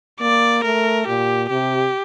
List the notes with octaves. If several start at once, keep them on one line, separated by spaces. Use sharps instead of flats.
A#3 D5
A3 A#4
A#2 G4
C3 G4